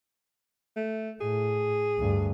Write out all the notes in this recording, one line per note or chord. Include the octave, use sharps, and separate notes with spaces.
A3
A2 G#4
D2 G2